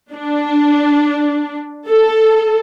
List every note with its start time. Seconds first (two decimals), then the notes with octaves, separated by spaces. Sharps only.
0.14 D4
1.89 A4